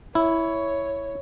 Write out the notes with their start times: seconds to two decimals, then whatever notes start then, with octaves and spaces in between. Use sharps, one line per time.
0.15 E4 C#5